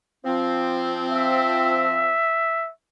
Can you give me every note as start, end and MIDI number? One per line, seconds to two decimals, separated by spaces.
0.25 2.14 53
0.25 2.14 60
1.11 2.70 76